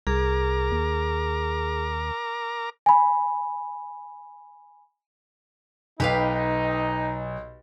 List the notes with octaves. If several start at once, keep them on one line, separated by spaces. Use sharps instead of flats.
C2 G#4 A#4 A#5 D6
D#2
G#5 B5
B1 D#4 G4 B4 F5